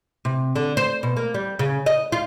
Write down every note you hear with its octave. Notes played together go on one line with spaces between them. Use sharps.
C3
D3
C5
B2
A#3
G3
C#3
D#5
F4